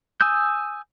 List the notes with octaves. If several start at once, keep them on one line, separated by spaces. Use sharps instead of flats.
G#5 D#6 E6 G6